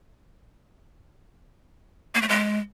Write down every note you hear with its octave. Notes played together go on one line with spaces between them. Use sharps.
A#3
A3
G#3